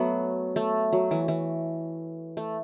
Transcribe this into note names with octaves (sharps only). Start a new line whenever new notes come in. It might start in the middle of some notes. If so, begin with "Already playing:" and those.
Already playing: F#3 A3 B3
A3
F#3
E3
E3
A3